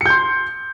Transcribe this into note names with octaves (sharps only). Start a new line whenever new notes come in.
C6 G6 C#7